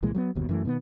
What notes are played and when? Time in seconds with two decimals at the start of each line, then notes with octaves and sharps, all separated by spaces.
0.02 C2 A#2 E3 G#3
0.14 F#3 G3 B3
0.35 G1 D#2 B2
0.49 F#2 E3 A3
0.65 B2 D#3 A#3 B3